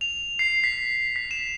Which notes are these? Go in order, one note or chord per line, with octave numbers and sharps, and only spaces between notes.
F7
C7
B6
B6
E7